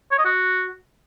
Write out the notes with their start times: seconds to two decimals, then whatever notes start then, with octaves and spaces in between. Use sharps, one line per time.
0.12 C#5
0.19 D#5
0.25 F#4